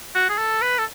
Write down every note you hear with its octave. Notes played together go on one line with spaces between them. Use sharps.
F#4
G#4
A4
B4
A4